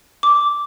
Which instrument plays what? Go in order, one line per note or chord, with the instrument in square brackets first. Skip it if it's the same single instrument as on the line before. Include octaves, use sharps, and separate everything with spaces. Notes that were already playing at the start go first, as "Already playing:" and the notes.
[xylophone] D6